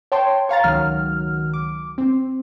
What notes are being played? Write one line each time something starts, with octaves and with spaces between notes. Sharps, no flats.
C#5 G5 A5 C6
C#5 F5 A#5 A6
C#2 D#3 F#3 F6
D6
C4